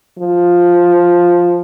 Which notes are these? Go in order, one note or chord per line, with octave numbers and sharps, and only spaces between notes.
F3